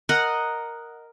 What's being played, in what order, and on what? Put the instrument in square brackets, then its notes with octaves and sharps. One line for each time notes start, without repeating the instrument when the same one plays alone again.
[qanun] A#4 D#5 F#5